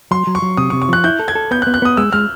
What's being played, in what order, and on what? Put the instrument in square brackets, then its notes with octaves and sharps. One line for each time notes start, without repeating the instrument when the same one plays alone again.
[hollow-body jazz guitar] F#3 [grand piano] C6
[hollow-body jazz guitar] F#3
[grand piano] C#6
[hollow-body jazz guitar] F#3
[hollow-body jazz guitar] C3 [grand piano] D#6
[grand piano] C#6
[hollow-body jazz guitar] C3
[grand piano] C#6
[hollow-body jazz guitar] F3 [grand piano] F#6
[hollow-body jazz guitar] E4 [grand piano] G6
[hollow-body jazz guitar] A4
[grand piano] G#6
[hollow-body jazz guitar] A4
[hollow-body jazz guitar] B3 [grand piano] G6
[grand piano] F#6
[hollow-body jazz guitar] B3
[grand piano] F#6
[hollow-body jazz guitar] B3 [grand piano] D#6
[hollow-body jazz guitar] G#3 [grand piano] E6
[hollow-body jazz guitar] G#3 [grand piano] F6